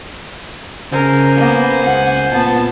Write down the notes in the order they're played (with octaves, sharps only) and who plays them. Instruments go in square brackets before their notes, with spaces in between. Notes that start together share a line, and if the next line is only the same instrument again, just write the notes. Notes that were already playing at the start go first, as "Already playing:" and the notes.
[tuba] C#3 [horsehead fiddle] A#4 [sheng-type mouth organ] C5 G#5
[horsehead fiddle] A#3 B3
[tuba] C#2 [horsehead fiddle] F#5
[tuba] A#2 [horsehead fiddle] B3 A5